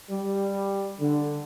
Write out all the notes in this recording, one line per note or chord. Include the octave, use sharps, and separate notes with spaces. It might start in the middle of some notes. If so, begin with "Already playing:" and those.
G3
D3